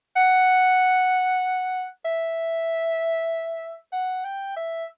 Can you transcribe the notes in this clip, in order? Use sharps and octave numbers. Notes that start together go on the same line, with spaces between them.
F#5
E5
F#5
G5
E5